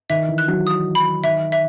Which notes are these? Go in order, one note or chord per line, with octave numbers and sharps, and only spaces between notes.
D#3 E5
E3
F#6
F#3
D#6
B5
D#3 E5
E5